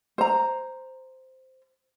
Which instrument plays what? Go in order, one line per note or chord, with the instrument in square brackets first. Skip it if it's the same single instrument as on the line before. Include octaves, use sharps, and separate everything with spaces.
[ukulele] C5 A#5